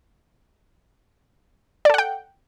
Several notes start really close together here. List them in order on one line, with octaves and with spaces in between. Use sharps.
D5 A4 F#5 G5